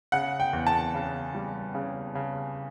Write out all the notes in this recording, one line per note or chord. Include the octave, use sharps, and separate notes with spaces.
C#3 F#5
G5
E2
A5
C#3
G3
C#3
C#3